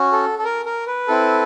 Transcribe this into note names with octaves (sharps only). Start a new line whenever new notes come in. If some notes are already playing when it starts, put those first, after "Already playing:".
Already playing: C#4 F#4
A4
A4
A#4
A#4
B4
C4 E4 A4